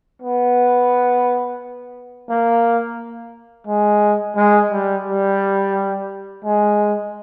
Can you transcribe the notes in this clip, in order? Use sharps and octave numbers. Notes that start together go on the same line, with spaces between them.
B3
A#3
G#3
G#3
G3
G3
G#3